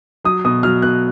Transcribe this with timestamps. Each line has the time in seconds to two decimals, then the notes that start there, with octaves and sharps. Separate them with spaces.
0.24 F#3 D#6
0.45 B2 D#6
0.63 F#3 F6
0.82 B2 F#6